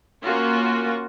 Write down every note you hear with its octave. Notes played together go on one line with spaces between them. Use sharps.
A#3 C#4 F4 F#4